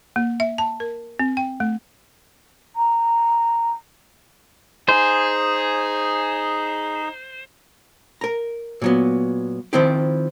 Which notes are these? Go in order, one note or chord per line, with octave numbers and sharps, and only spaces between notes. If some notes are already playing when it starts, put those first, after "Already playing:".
A#3
E5
A5
A#4
C4
G5
A3
A#5
D#4 G#4 C5
A#4 A#5
A#2 F#3 B3
D#3 F3 C4 E4 G4